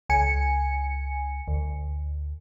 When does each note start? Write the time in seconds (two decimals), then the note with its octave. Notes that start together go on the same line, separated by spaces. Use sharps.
0.09 C#2 G#5 C#7
1.48 D2